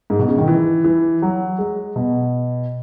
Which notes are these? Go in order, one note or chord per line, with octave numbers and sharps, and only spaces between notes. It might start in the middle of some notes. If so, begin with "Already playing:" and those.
G#2
B2
C#3
D#3
E3
E3
F#3
G#3
B2